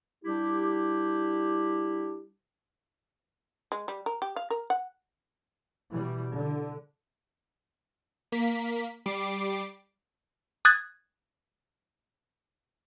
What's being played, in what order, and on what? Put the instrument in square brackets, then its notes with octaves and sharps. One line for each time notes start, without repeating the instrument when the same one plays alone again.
[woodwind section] G3 D4 E4 G4
[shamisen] G#3
G3
A#4
G4
F5
A#4
F#5
[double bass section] B2 E3 G3
D3
[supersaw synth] A#3 B6
G3 D6 C7
[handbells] D#6 F#6 G#6 A6